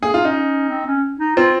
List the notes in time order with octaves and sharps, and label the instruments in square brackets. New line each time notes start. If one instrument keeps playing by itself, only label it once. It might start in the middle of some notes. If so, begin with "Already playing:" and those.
[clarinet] A#3 [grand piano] G#4
[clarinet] D#4 [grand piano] F4
[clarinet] C#4 [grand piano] D#4
[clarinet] C4
C#4
D#4
[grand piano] C4 [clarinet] F4